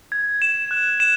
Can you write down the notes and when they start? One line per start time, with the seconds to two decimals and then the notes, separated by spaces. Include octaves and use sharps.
0.12 G#6
0.42 E7
0.71 F#6
1.00 E7